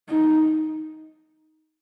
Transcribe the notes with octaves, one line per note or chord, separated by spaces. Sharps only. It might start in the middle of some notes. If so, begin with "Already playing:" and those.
D#4